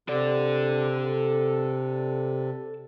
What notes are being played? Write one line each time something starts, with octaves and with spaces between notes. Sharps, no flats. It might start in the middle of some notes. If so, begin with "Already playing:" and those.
C3 A4 D5